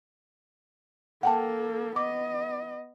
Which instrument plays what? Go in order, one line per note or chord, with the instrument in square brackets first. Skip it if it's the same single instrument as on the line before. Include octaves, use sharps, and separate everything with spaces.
[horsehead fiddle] A#3 A4 [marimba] F#5 G5 A5
[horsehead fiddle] B3 D#5 [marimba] D6